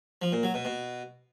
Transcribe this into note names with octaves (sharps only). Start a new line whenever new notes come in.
F3
A#2
F#3
B2
B2